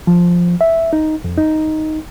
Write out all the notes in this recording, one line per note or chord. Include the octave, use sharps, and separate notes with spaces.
F3
E5
D#4
F2
D#4